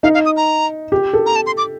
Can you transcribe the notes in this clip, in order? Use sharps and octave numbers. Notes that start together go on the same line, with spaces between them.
D#4 F5
F5
D#6
A#5
G4
A4
A#5
A5
C6
D6